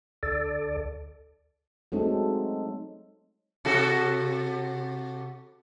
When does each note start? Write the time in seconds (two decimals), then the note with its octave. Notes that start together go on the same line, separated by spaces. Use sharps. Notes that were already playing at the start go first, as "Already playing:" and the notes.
0.23 D2 A4 D5
1.92 F#3 G#3 A3 C4 D#4 A4
3.65 C3 F#4 A4